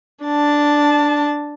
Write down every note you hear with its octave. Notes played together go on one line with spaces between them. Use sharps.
D4 A5